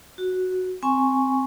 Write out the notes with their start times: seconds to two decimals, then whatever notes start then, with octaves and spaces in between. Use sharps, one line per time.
0.18 F#4
0.83 C4 G#5 C#6